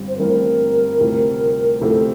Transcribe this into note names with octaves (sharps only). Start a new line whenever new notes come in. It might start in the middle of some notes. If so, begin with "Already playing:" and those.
Already playing: G1 G2 C4
C5
G1 G2 E3 A3 C4 A#4
D2 C3 F3 C4 E4
D2 C3 F3 C4 E4 A4